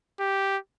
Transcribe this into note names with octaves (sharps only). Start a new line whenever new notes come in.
G4